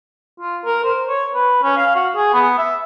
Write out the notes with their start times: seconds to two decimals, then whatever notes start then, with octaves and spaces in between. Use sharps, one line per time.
0.40 F4
0.65 A#4
0.84 C5
1.09 C#5
1.34 B4
1.63 C#4
1.76 F5
1.95 F#4
2.16 G#4
2.33 B3
2.58 E5